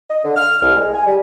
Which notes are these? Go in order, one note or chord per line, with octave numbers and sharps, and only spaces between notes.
D#5
D3
F6
C2
G#3
G#5
G3